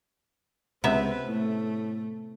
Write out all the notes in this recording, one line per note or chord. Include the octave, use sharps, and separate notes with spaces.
C#2 C3 B3 C4 B4 E5
A2 A3